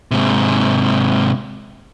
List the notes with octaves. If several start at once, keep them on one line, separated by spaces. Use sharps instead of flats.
G#2 C3